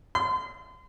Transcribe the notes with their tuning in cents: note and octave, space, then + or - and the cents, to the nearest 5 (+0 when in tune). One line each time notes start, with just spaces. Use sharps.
C6 -35